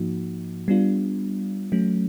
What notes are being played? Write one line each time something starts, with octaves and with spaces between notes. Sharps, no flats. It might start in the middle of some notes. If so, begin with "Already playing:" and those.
Already playing: G#2 F3 A#3 D#4 F#4
G3 B3 D4 F4
F#3 A3 C#4